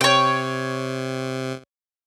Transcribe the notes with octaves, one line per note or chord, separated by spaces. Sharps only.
C3 C#5 G5